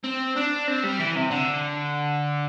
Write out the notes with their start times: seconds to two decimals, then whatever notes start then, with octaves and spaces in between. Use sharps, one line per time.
0.04 C4
0.36 D4
0.67 C4
0.83 G3
0.99 E3
1.15 C3
1.31 D3